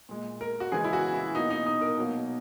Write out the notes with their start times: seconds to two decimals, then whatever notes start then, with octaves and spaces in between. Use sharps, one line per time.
0.09 A#2 G#3
0.41 A#4
0.60 F#4
0.72 C#3 E3 G#3 G#4
0.84 E4
0.93 F#4
1.14 E4
1.35 B2 F#3 A#3 D#4
1.50 D#4
1.66 D#4
1.81 A#4
1.98 B2 F#3 A#3